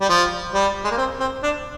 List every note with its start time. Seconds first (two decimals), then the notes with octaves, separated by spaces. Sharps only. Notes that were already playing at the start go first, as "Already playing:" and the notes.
0.01 G3
0.09 F3
0.53 G3
0.84 G#3
0.91 A#3
0.98 C4
1.20 C4
1.43 D4